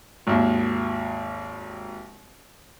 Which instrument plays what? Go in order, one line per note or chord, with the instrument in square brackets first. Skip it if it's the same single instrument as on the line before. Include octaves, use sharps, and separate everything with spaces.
[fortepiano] G#1 D#2